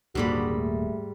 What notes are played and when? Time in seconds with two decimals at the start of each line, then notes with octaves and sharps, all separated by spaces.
0.15 D#1 G#2 D3 G3 A#3 F#4 B5
0.52 A3